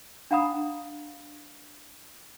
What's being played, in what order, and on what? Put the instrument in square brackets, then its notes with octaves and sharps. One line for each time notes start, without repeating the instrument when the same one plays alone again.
[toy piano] D4 F5 F#5 A#5 B5 D#6